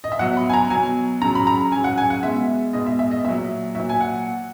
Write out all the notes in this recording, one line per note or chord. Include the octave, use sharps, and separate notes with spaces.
D#5
E5
B2 F#3 F#5
B5
G#5
A#5
B2 F#3 G#5
C#3 F#3 A#5
B5
A#5
C#3 F#3 G#5
F#5
G#5
F#5
B2 G#3 E5
B2 G#3 D#5
E5
E5
D#5
A#2 F#3 E5
A#2 F#3 E5
G#5
F#5